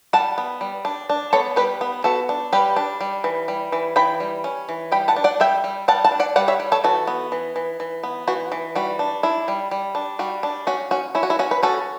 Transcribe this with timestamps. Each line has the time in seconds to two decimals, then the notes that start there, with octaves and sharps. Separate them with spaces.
0.13 G3 F#5 A5
0.38 B3
0.61 G3
0.85 D4
1.10 D4
1.33 B3 A4 C#5
1.56 G3 G4 B4
1.81 B3
2.04 B3 F#4 A4
2.29 D4
2.53 G3 G4 B4
2.76 D4
3.01 G3
3.24 E3
3.48 G3
3.72 E3
3.96 E3 G5 B5
4.20 G3
4.44 C#4
4.69 E3
4.92 G3 G5 B5
5.08 F#5 A5
5.16 D4
5.24 D5 F#5
5.40 G3 E5 G5
5.64 G3
5.88 G3 F#5 A5
6.04 F#5 A5
6.12 D4
6.20 D5 F#5
6.36 G3 D5 F#5
6.48 C#5 E5
6.60 G3
6.72 A4 C#5
6.84 E3 F#4 A4
7.07 B3
7.32 E3
7.56 E3
7.80 E3
8.03 B3
8.28 E3 F#4
8.52 E3
8.75 G3 F#4
8.99 D4
9.23 D4 E4
9.48 G3
9.71 G3
9.95 D4
10.19 G3 F#4
10.43 D4
10.67 C#4 F#4
10.91 C#4 F#4
11.15 C#4 E4
11.23 F#4
11.30 E4
11.39 C#4 F#4
11.51 B4
11.63 C#4 F#4 A4